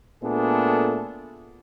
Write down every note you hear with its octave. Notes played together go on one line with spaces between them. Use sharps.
A#2 A3 B3 D4 G#4 A4